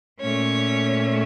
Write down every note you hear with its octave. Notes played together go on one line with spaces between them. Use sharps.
A#2 A3 C#4 C#5